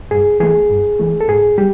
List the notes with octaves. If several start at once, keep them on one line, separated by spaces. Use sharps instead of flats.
G2 G#4
E3 A3 G#4
G2
E3 A3
A4
G#2 G#4
G3 G4